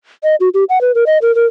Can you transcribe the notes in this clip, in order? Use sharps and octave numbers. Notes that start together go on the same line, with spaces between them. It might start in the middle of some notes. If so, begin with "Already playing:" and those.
D#5
F#4
G4
F#5
B4
A#4
D#5
A#4
A#4